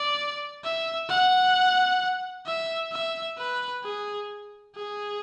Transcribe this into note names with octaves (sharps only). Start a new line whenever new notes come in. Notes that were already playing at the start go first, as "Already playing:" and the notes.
Already playing: D5
E5
F#5
E5
E5
B4
G#4
G#4